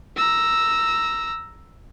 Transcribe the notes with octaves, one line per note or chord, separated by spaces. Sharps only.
A#5 E6